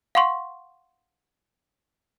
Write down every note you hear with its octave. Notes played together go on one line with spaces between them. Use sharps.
F5 F#5 C6 C#6